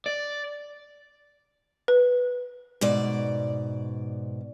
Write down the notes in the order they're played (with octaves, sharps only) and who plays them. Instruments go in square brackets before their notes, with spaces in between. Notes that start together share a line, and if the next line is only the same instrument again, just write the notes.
[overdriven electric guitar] D5
[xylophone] B4
[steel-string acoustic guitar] G#2 B2 D5